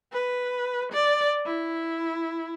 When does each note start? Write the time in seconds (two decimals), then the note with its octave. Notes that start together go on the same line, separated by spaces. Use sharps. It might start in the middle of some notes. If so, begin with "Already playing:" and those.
0.13 B4
0.92 D5
1.46 E4